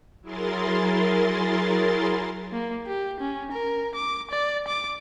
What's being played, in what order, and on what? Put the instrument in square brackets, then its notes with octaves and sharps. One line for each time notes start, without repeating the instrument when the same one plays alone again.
[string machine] F#3 E4 G#4 A#4 C6 A6
[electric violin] A#3
G4
C#4
A#4
D6
D5
D6